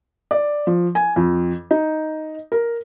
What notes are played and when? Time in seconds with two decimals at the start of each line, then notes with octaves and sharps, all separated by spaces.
0.31 D5
0.67 F3
0.95 G#5
1.16 F2
1.71 D#4
2.52 A#4